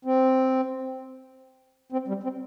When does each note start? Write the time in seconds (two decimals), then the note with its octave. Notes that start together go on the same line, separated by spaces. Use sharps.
0.05 C4
1.92 C4
2.08 G3
2.23 C4